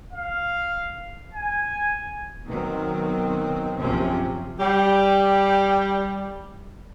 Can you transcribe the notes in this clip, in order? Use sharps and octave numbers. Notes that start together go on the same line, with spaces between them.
F5
G#5
B2 D#3 F#3 C4
A#1 F#2 C3 F3 C4 C#4
G3 G4